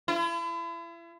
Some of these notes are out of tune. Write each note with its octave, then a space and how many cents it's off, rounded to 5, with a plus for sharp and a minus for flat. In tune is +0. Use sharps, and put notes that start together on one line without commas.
E4 +40